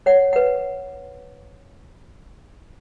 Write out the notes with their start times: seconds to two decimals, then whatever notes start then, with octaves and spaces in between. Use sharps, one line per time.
0.06 C#5 F#5
0.33 B4 F#5